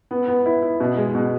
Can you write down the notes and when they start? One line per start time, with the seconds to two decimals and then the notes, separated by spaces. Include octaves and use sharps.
0.11 B3
0.28 B3
0.46 E4
0.63 E4
0.80 B2
0.97 G#3
1.15 B2